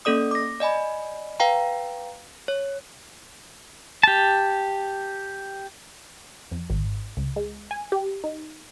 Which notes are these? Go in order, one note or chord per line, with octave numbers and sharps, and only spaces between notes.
A#3 C#4 A4 D5 D#6
D6 A#6
D5 D#5 G#5 B5
B4 F5 G5 A#5
C#5
G4 A5
F2
G#1
C#2
G#3
G#5
G4
D#4